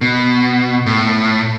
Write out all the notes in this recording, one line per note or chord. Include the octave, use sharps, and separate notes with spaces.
B2
A2